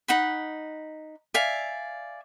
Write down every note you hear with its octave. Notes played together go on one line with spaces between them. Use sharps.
D#4 F#5 B5
D5 E5 F5 G#5